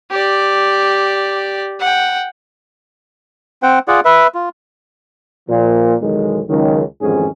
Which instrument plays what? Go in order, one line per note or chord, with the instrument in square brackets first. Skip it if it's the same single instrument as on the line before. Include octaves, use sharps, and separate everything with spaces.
[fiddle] G4 D5
F#5 G5
[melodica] C4 C5 F#5 G5
F4 G#4 D5 F#5
B4 E5
F4
[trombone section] A#2 F3
B1 E2 D#3 G#3
C#2 D#3 F#3
A1 F2 G#2 D#3 C#4 G#4